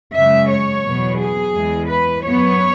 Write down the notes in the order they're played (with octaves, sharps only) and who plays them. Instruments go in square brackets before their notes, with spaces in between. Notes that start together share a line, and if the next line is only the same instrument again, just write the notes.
[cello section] F#2 C#3 G#3 E5
C#5
E2 B2 F#3 B3
G#4
E2 E3 G#3
B4
F#2 F#3 B3 C#5